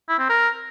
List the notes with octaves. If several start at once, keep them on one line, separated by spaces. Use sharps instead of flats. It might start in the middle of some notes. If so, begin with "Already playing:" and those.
E4
C4
A#4